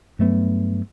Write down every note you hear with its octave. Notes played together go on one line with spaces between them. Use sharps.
G2 F#3 A3 B3